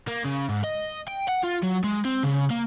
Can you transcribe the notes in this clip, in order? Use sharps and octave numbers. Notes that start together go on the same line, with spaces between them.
A#3
C#3
G#2
D#5
G5
F#5
F4
F#3
G#3
C4
C#3
A#3